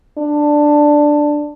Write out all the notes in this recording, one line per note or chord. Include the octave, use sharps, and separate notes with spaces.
D4